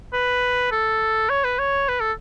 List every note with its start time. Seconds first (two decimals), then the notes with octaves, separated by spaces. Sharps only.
0.13 B4
0.72 A4
1.29 C#5
1.44 B4
1.59 C#5
1.88 B4
2.00 A4